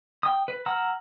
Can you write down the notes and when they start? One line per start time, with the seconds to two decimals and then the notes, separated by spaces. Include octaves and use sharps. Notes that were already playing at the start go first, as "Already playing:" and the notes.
0.23 G5 D#6
0.48 B4
0.66 F#5 A#5 E6 F6